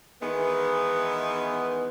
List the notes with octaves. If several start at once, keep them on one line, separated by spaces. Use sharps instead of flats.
D#3 E3 G#3 B3